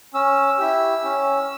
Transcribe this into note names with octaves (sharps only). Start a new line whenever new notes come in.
C#4 E6
E4 G4
C#4